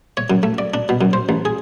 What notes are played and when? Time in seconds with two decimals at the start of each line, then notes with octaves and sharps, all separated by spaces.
0.17 C#5
0.30 F#2
0.43 A3
0.58 D5
0.74 D4
0.89 B2
1.01 F#2
1.13 C5
1.29 A1
1.45 G#4